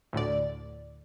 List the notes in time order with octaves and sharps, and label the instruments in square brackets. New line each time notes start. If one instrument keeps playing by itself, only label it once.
[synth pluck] D2 A2 D3 D5